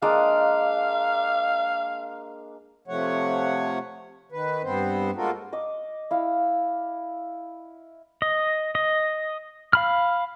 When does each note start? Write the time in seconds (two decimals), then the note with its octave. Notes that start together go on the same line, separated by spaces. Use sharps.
0.02 G#3 A#3 D4 F5
2.88 C3 F3 A3 C#5 F#5
4.32 D#3 B4
4.63 G2 B3 C4 C5
5.16 G#3 A#3 F4 F#4 A4 A#4
5.53 D#5 D6
6.11 E4 F5
8.22 D#5
8.75 D#5
9.73 F5 B5 F6